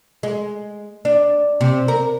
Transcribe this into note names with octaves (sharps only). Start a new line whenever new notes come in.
G#3
D4
C3
A#4